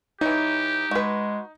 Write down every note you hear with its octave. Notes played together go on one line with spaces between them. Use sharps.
E3 D#4 G4 C#5
G#3 F#4 B4